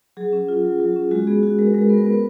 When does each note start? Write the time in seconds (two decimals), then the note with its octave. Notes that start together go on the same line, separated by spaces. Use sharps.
0.17 F#3 G#4
0.33 C#4
0.48 F4
0.64 F#3
0.80 F#3
0.96 C#4
1.11 G#3 F#4
1.27 B3 G#4
1.43 F#4 G#4
1.59 G#3 A#4
1.66 B4
1.74 G#3 A#4
1.82 B4
1.89 B3 A#4
1.97 B4
2.05 B3 A#4
2.12 B4